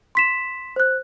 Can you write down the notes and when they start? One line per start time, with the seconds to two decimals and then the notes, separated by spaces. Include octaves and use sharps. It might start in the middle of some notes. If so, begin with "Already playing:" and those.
0.15 C6 B6 E7
0.76 C5 F#6